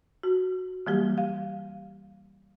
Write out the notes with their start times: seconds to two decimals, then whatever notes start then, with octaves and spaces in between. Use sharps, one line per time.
0.23 F#4
0.86 E3 F#3 G3 A#3 G4
1.18 F5